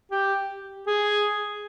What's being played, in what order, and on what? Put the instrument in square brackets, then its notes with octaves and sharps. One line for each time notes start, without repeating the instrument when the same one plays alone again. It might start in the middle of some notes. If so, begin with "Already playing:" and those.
[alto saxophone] G4
G#4